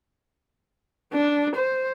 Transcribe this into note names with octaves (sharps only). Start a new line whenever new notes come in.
D4
C5